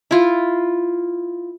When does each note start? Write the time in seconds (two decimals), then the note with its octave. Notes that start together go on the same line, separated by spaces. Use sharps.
0.11 E4 F4